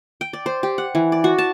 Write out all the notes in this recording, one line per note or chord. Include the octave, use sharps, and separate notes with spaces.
G5
D5
C5
G4
F#5
E3
D5
F#4
A5